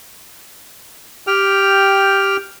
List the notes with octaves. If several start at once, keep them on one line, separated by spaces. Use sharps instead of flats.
G4 G5 F6